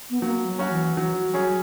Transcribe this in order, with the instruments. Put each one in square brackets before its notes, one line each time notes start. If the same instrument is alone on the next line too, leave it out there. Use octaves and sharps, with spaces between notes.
[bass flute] B3
[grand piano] F#3 [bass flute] A#3
[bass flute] F#3
[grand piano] C#4 F#4 C#5
[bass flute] E3
[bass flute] E3 [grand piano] F#3
[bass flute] F#3
[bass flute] F#3 [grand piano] C#4 G#4 C#5